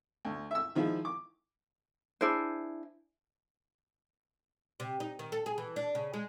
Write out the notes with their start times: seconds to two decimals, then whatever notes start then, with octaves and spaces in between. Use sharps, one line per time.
0.25 D2
0.51 E5 E6
0.75 D#3 F3 G#3 E4
1.05 D6
2.21 D4 E4 G#4 C5
4.80 C3
5.00 D#4
5.19 D#3
5.32 A4
5.46 G#4
5.58 E3
5.76 D4
5.95 C#3
6.14 G#3